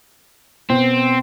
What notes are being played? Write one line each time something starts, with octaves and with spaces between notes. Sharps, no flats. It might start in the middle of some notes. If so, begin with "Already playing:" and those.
B2 C4